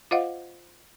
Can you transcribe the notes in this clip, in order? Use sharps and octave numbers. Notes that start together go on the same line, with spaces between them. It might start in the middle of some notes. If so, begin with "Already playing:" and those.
F4 C5 D#5 F5 F#5